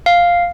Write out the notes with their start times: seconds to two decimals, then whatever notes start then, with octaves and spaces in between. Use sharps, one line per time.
0.06 F5